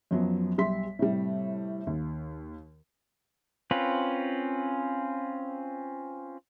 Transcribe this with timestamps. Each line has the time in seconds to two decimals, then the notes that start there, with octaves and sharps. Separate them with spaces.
0.11 F#2 F3 F#3 B3
0.58 B1 G3 E5 C6 B6
0.99 A2 C3 G3
1.87 D#2
3.71 C4 C#4 F4 B4